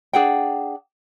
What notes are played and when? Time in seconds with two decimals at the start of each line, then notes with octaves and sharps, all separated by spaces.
0.13 D4 G#4 F#5 G5